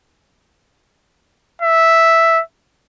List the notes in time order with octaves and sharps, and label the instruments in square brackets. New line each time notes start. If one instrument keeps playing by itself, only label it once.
[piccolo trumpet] E5